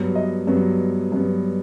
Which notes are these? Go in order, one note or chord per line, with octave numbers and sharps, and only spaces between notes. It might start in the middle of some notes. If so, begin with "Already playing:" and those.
Already playing: G2 F#3 B3
D#5
G2 F#3 B3
G2 F#3 B3